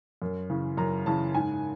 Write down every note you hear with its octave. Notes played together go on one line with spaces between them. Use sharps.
F#2
C#3 E3
F#2 A#5
C#3 E3 A5
G#2 G#5